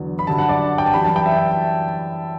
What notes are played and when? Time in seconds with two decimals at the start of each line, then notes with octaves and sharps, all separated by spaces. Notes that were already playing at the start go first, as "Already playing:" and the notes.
Already playing: E2 D3 F#3
0.19 B5
0.27 F#2 D3 G3 A5
0.38 F#5
0.49 D5
0.78 G5
0.86 A5
0.94 F#2 E3 G3 B5
1.04 A5
1.16 G5
1.26 E5